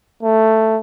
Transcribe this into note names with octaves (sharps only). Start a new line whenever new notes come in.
A3